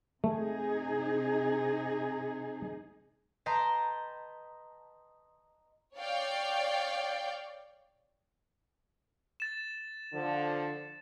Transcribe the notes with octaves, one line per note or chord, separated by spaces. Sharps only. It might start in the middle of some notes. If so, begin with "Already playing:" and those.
C3 A3 D#4 G#4
B4 D#5 G5 A5 A#5 C6
C#5 D5 F5 G5
A6 E7
D3 F3